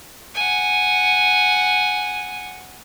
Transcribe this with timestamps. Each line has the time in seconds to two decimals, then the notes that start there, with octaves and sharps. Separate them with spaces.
0.35 F#5 G#5